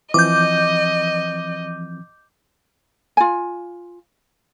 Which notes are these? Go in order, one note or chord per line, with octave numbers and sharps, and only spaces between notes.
E3 F3 C4 D#5 D6 G6
F4 G#5